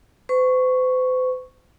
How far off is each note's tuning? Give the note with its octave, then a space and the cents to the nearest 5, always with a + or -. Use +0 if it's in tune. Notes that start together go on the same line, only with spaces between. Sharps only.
C5 -45 C#6 +0